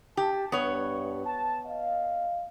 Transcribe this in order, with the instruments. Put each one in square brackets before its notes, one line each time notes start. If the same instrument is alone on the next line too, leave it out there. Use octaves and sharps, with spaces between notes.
[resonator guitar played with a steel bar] G4 [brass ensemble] A5
[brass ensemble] G2 [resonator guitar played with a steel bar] B3 C#5
[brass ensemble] A5
D#5 F5